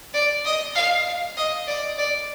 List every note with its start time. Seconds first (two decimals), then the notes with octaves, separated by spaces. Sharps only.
0.14 D5
0.45 D#5
0.75 F5
1.37 D#5
1.67 D5
1.98 D5